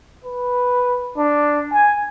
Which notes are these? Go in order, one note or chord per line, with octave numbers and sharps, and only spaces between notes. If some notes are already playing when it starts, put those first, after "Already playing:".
B4
D4
G#5